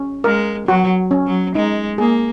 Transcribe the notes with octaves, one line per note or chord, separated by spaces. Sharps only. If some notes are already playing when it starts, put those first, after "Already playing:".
Already playing: C#4
G#3 A#4
F#3 F#4
C#4
F#3
G#3 D#4
A#3 G#4